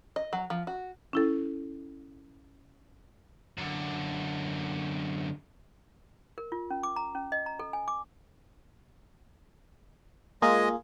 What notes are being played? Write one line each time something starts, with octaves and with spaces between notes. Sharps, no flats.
D#5
F#3
F3
F#4
C#4 E4 A4
F#2 D3
A#4
F4
C#4
D6
A#5
C#4
D#5
A#5
A4
G#5
D6
G#3 A#3 F4 G#4 D#5